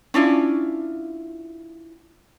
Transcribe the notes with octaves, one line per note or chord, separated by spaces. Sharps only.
C#4 D4 E4 F4